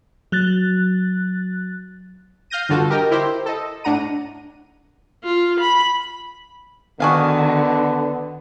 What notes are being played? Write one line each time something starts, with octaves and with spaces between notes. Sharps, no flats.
F#3 F#6 A6
F5 F6 G6 A#6 D#7
G2 D3 F4 F#4 A4
G4 A#4 D#5 G5
E4 G4 C5
A4 D#5
A2 D4 F#5 A#5 D#7
F4
B5
D3 D#3 B3 F#4 G#4 F5